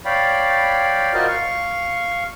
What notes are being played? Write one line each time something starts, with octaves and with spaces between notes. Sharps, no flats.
C#5 D5 F5 G5 B5
F4 F#4 A#4 C5 D5 D#5
F5 C#6